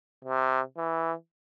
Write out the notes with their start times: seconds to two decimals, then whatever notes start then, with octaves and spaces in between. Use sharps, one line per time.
0.25 C3
0.77 E3